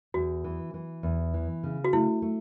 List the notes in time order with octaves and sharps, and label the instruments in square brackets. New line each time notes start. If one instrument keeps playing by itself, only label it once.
[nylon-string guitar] E2 [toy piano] F#4
[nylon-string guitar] E3
E3
E2
E3
C#3
[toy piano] F#4
[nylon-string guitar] A3 [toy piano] E4
[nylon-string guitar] A3